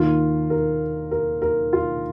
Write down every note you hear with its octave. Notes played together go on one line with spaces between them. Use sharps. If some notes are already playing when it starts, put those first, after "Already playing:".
Already playing: D#2 D#3 A#3 F4
A#4
A#4
A#4
F4